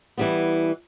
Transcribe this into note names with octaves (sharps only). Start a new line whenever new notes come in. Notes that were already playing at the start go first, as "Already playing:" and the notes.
E3 G3 B3